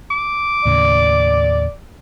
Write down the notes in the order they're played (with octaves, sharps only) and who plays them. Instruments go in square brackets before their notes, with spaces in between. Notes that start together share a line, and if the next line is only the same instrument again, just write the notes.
[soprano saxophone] D6
[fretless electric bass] D#2 A2 C#3 [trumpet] D5